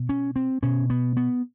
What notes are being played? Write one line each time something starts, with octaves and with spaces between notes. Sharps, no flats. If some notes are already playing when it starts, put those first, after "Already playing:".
Already playing: B2
C#4
C4
B2 C#4
B3
B3